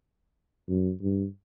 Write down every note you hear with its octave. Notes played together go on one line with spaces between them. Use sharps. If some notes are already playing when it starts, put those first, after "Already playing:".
F#2
G2